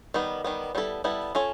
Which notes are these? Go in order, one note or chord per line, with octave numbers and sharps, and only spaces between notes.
D#3 G3 B3
D#3 G3 B3
G3 B3 E4 A4
G3 B3 E4 A4
C#4 F4 A4 C#5